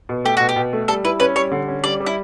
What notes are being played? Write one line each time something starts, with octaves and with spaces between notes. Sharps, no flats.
B2
A3 G4
B2 F#4
G4
B2
A3
G3 A4
E4 B4
C#4 B4
G3 C#5
D3
C#4
G3 D5
G3
E4